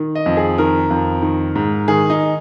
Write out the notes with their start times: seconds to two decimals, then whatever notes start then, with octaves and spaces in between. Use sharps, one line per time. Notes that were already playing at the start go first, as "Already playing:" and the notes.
Already playing: D#3
0.15 D#5
0.26 F2
0.37 G#4
0.58 D#3 A#4
0.90 F2
1.22 D#3
1.55 G#2
1.88 D#3 G#4
2.10 D#4